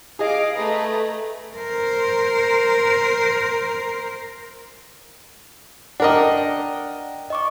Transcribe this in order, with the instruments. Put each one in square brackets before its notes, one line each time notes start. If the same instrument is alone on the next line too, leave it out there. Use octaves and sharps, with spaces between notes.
[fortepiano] G#4 D#5 [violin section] F5 D6
[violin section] A3 B4 A#5
[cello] A#4 C5
[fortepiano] D4 A#4 D#5 [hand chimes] F#5 G5
[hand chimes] D#5 C#6 D6